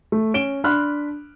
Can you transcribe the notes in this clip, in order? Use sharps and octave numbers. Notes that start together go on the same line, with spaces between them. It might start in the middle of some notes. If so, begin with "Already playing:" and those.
A3
C#4 D7 E7 G7
D4 B5 C6 F6 F#6